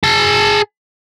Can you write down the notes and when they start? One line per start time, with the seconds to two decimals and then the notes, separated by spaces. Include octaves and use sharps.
0.04 G#4 A5